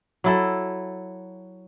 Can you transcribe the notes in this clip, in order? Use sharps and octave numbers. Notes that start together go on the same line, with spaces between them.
F#3 E4 A4